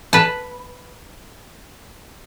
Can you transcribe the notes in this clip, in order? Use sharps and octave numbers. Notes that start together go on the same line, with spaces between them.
B4 A5